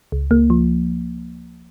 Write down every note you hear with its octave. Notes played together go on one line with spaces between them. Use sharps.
C#2
C#2 A#3
F3